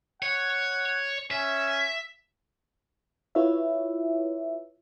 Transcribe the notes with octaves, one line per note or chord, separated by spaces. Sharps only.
C#5 F#5
C#4 E5
E4 F4 B4 C#5 E5